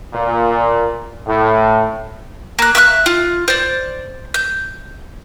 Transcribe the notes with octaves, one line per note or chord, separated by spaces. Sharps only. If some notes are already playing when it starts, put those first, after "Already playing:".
A#2
A2
A#3 F#6
E5 F5 C#6 F#6
F4
C5 D5
G6